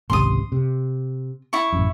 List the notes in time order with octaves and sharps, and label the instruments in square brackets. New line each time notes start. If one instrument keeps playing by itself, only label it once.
[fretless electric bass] G#1 C#2 C3 [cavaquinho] C6 D#6
[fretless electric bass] C3
[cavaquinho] E4 C#6
[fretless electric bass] A1 F#2